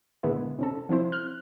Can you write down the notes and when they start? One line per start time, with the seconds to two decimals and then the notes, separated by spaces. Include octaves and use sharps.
0.23 A#2 D3 G#3 B3 E4
0.59 C3 C#4 A4
0.89 F3 C4 E4 C5
1.12 F6 F#6